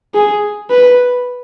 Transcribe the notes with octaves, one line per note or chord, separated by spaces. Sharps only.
G#4
B4